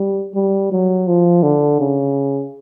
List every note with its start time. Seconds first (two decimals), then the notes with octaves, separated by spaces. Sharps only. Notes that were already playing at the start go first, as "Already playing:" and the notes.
Already playing: G3
0.35 G3
0.72 F#3
1.07 F3
1.43 D3
1.80 C#3